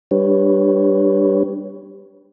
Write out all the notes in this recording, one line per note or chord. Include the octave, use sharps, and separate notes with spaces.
G3 D4 G4 B4 C#5